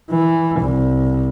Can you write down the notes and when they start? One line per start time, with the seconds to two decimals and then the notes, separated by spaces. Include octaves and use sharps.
0.11 E3
0.60 C2